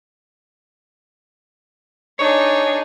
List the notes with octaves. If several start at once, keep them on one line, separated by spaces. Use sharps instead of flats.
D4 D#4 G#4 C#5